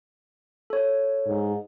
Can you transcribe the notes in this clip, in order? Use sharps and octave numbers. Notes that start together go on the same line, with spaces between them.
A4 C#5
G#2